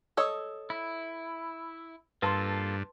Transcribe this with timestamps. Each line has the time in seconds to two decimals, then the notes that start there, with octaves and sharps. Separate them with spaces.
0.17 A4 C#5 D#5 D#6 E6
0.70 E4
2.22 G2 A#3 F4 A4 B4 A5 C6